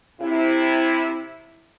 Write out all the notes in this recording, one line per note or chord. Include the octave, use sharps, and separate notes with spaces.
C3 E4